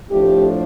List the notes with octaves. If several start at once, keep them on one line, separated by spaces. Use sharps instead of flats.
A2 F3 A3 D4 G4